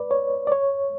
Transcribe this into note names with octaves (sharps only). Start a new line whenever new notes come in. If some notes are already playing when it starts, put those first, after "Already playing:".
Already playing: B4 D5
C#5
D5
C#5